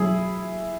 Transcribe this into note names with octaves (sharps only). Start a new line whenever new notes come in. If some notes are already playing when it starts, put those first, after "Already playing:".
Already playing: F#3 E4 G#4